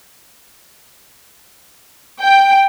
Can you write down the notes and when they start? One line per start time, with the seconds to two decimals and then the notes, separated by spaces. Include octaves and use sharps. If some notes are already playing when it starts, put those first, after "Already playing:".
2.19 G5